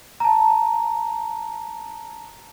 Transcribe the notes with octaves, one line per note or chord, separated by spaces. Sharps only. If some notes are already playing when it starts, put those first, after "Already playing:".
A5 A#5